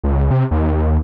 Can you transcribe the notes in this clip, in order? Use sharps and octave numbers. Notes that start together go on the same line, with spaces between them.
C#2
C3
D#2